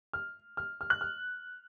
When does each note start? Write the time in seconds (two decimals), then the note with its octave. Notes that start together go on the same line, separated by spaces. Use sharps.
0.13 F6
0.57 F6
0.81 F6
0.90 F#6
1.01 F6